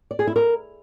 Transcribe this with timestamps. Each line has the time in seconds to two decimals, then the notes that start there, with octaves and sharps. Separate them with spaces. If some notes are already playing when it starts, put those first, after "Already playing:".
0.11 D5
0.19 G#4
0.27 E4
0.36 A#4